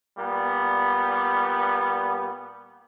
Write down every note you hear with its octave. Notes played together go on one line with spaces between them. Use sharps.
A#2 G3 B3